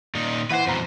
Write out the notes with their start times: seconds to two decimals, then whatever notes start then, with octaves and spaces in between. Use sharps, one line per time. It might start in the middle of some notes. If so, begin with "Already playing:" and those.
0.15 A#2 D#4
0.50 E3 B4 C5 F#5 C7
0.67 F2 B2 C5 A#5